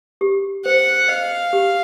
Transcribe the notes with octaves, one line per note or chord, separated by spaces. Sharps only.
G4
C5 F#5
D#5 F5
G4